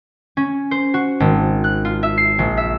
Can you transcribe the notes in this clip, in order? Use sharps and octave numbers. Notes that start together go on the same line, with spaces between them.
C#4
C5
F#4
G#1
F#6
F4
E5
C7
A#1
E5